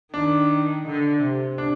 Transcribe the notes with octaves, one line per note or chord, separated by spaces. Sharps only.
D#3 D4
D3
C3
D4